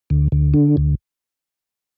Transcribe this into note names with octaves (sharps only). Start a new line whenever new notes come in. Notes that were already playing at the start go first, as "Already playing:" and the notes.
D2
D2
D3
D2